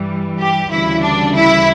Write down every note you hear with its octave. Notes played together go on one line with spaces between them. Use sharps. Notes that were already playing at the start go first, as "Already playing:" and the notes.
Already playing: G2 E3 G3
G4
D2 C#3 E3 G3 E4
D4
E4